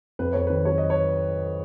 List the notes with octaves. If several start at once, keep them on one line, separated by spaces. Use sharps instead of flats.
F2 B4
F2 C#5
D#3 B4
F#3 C#5
D#5
C#5